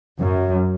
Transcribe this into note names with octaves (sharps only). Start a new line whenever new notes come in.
F#2